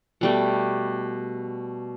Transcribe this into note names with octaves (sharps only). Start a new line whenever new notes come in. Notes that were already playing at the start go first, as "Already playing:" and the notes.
B2 G3 A3